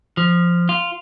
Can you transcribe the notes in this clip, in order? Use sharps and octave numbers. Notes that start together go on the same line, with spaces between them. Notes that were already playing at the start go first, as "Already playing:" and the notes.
F3
F4